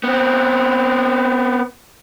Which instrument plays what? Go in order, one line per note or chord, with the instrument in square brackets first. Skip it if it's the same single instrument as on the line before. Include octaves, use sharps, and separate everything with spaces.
[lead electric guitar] B3 C4